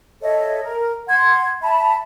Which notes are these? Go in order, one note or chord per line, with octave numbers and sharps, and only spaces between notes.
A4 C#5 D#5 E5
A#4
F#5 C6 G#6
E5 A5 B5